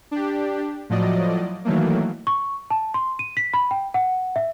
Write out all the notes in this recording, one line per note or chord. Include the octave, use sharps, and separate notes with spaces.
D4 G4
A2 F3 F#3 D5 D#5
D#3 E3 F#3 A3 A#3
C#6
A5
C6
D#7
B6
B5
G5
F#5
E5